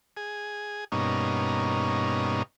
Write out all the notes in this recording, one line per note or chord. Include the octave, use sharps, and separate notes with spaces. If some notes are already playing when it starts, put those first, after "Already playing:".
G#4
G2 B2 A#3 C#4 D#4